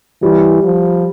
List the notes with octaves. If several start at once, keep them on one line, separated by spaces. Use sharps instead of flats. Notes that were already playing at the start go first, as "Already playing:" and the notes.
E3 G3
F3